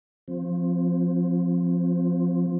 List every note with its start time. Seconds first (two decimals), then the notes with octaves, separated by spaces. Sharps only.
0.28 F3 C4